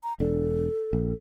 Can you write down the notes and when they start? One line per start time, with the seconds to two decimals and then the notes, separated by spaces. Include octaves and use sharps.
0.03 A#5
0.20 E1 D4 A4
0.93 A#1